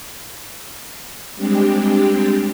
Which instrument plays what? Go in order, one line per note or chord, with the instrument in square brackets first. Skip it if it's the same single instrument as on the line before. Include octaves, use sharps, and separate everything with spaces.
[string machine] G3 G#3 C4 D4 G4